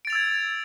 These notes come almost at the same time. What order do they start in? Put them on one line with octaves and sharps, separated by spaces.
D7 A6 F7 E6 G#6